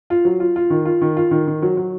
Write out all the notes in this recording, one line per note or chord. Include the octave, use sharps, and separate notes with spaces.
F4
F#3
F4
F4
D#3
F4
D#3
F4
D#3
D#3
F#3
F#3